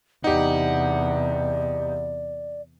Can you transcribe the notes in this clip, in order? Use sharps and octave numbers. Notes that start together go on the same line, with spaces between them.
E2 C3 D#4 G4 D5 F#5